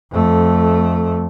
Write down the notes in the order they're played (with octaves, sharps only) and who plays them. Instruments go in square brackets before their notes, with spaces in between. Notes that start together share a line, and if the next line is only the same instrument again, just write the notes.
[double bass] F2 A3